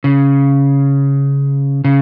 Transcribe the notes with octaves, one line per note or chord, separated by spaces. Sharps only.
C#3
C#3